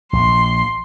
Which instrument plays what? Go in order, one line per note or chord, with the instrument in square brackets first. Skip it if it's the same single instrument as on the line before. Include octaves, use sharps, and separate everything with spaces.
[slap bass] A#1 [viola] C6